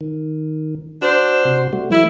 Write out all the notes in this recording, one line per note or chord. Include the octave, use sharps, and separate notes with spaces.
D#3
D4 F#4 C5 E6
C3 F#4
G3 A3 F#4
E3 F#3 A3 E4